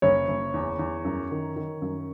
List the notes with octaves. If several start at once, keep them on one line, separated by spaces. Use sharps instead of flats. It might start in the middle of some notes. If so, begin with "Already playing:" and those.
F#1 C#5
F#1
E2
E2
F#2
D#3
D#3
F#2